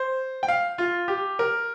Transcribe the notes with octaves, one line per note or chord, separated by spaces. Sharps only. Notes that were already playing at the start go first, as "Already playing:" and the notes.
Already playing: C5
G5
F5
F4
G4
A#4